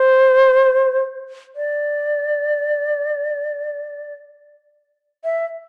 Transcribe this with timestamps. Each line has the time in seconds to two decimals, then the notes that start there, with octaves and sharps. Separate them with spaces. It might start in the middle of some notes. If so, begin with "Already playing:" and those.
Already playing: C5
1.56 D5
5.24 E5